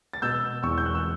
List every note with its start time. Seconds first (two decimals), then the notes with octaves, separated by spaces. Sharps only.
0.13 A6
0.22 B2 E6 G6
0.63 E2 C#6 E6
0.78 G6
0.86 F#6
0.95 E6